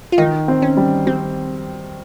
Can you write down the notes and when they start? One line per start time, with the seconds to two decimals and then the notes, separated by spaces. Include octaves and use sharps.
0.12 F4
0.18 D#3 D#4
0.48 C4
0.62 C#4
0.77 G3
1.06 G3 C4